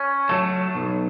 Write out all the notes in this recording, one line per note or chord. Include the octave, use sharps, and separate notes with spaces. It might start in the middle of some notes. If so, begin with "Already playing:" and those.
Already playing: C#4
F#3 A3
B1